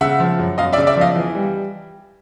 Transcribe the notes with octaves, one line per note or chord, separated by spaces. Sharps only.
C#3 E5 F#5
F3
F#2
F#2 D#5 F5
D5 E5
C#3
D5 E5
F3 D#5 F5
E3
G3